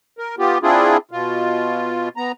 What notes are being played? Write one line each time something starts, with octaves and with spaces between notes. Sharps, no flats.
A#4
B3 F4 G4
C4 D4 E4 F4 G#4
B2 F4
B3 A#5